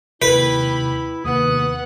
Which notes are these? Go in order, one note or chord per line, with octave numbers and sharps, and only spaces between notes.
D#2 C3 E4 G4 B4 B5
D#2 C3 B3 F#5 D#6